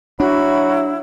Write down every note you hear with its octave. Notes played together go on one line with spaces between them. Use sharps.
F#3 D4 E4 F#4 B5